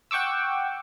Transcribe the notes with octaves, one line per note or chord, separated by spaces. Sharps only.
F#5 G5 C#6 D6 E6